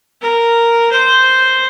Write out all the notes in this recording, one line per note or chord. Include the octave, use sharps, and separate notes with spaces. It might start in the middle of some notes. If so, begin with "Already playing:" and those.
A#4
C5